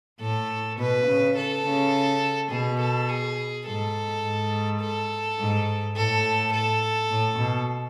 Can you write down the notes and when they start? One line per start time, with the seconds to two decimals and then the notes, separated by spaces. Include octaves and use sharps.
0.21 A2 A4
0.79 B2 B4
1.07 C#3
1.36 A4
1.65 C#3
2.50 B2 G#4
2.80 A4
3.09 G#4
3.66 G#2 A4
4.24 G#2
4.80 A4
5.39 G#2
5.96 A2 A4
6.53 A4
7.10 A2
7.39 B2